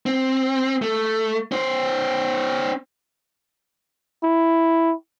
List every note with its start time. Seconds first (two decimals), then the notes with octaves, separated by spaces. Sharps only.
0.06 C4
0.82 A3
1.52 C#4 C5
4.24 E4